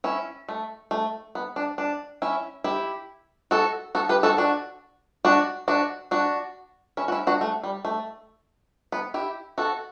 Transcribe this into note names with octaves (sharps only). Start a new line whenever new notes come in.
C#4 E4
A3
A3
B3
D4
D4
C#4 E4
E4 G4
F#4 A4
F#4 A4
G4 B4
F#4 A4
D4 F#4
D4 F#4
D4 F#4
D4 F#4
C#4 E4
F#4
C#4 E4
D4 F#4
A3
G3
A3
B3
E4 G4
F#4 A4